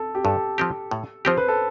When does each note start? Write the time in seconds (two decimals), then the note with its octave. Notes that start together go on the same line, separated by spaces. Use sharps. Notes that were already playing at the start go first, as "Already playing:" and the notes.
Already playing: A4
0.15 G4
0.25 G2 A4
0.58 F3 C4 G4
0.91 A2
1.25 F3 C4 G4 C5
1.37 B4
1.48 A4